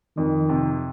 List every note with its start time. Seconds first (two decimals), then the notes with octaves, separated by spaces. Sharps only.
0.17 F2 D#3
0.49 C3